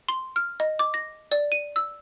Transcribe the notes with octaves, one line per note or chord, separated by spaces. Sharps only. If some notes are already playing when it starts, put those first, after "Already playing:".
C6
F6
D#5
D6
A#6
D5
D#7
E6